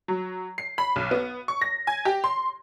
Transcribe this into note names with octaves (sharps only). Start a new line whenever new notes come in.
F#3
C7
B5
B1
B3
C#6
A#6
G#5
G4
C6